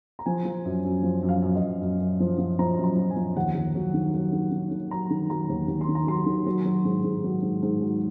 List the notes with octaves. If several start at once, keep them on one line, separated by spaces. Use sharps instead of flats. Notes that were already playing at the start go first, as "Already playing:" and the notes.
A#5
F3 G#5
F3
F#2
F#2
F3
F#2
F5
F#2
D#5
F#2
F#2
F#2
F3
F3
F3 A#5
F#2
A#5
F3
G#5
F3
D#2 F#5
D#2
F#3
D#3
F#3
D#3
D#3
D#3
F#3 A#5
D#3
F#3 A#5
D#2
D#2
C6
D#3
A#5
F#3 C6
D#3
F#3
F#3
G#2
G#2
F#3
G#2
G#2
F#3